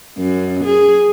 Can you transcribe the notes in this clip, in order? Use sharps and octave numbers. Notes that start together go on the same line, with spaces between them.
F#2
G#4